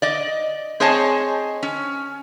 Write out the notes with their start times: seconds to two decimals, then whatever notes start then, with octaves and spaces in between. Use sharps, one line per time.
0.02 D5 D#5
0.80 C4 G#4 C#5 D#5 G#5 A5
1.63 C#4